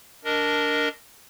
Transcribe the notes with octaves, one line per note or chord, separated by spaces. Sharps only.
D4 A#4 D#5